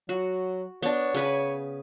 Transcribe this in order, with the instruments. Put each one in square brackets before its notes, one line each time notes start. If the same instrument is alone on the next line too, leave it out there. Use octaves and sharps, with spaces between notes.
[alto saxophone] F#3 [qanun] F#4
[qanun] B3 D4 [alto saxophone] C#5
[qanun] C#3 B4 G#5